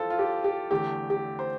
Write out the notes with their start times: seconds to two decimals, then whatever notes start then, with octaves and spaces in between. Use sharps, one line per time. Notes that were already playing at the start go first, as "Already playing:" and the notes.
Already playing: F2 E3 F4 A4 C5
0.10 F4
0.19 G4
0.44 G4
0.71 E2 D3 A3 G4
1.10 G4
1.39 C5